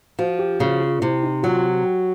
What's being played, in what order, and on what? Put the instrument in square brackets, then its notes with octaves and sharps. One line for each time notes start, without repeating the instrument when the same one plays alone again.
[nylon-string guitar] F3 [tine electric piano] F#4
[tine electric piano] G4
[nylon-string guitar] C#3 [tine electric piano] F#4
[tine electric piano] F4
[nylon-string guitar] C3 [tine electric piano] E4
[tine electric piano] D#4
[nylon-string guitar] F#3 [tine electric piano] F4